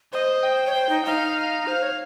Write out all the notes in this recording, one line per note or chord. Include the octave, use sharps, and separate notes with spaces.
C5 D#5
G5
C#5
C5
D#4
D#4 F5
C5 F5
C#5